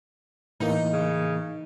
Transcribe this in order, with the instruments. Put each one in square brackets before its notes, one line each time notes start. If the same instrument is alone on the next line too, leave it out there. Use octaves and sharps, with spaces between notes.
[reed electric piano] A2 E3 A#3 [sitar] D#4
[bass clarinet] C#3